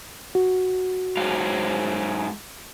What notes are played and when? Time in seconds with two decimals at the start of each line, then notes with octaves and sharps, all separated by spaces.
0.35 F#4
1.17 G#2 F#3 F5